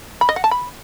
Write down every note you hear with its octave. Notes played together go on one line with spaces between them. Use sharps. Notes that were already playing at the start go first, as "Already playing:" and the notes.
B5
D#5
F#5
A5
B5